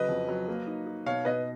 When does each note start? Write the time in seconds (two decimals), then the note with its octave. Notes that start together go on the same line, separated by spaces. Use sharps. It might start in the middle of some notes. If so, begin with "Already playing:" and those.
Already playing: C#3 F#3 B4 D#5
0.09 F2
0.29 F#3
0.48 A#3
0.67 D#4
0.87 D#4
1.06 B2 C#5 F5
1.25 B2 B4 D#5